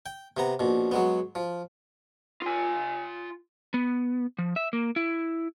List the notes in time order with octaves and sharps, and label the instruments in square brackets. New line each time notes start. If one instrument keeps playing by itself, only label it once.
[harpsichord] G5
C3 B3 A#5
A#1 B2
F#3 G#3 B3
F3
[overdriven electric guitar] F4 G#5
[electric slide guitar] B3
F3
E5
A#3
E4